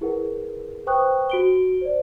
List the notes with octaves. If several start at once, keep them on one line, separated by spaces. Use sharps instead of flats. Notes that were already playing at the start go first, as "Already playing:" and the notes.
E4 G#4 A#4 B4 F#5
B4 C5 G5 C#6 D#6 F#6
F#4 D7 G7
C5 D5